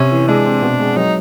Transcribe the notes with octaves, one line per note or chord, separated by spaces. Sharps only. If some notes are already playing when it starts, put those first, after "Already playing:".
Already playing: C3 C#4
E3
G#3 D4
C4
B2
G#3
F#3 D#4